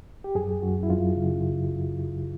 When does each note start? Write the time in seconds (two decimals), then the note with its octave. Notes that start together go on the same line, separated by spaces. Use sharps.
0.24 G4
0.35 F#2 G#4
0.62 F#2 F#4
0.83 E4
0.90 F#2 F4
1.17 C#3